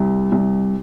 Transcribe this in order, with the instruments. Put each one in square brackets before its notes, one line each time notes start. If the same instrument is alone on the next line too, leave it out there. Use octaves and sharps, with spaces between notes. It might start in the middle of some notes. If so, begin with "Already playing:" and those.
Already playing: [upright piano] C2
C2